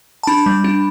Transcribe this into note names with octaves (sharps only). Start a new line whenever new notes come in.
A5
D4 B5
G3
D4